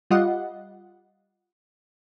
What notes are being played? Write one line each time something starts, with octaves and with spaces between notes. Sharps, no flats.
G3 F4 D#5 F#5